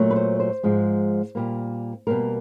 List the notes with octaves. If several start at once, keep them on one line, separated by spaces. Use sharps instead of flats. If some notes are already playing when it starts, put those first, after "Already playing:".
Already playing: A#2 F#3 A3
B4
C5
C5
G#2 F3 G#3
A#2 G3 A#3
B2 G3 A#3 A#4